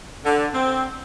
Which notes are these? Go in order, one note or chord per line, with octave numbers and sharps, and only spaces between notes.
D3
C4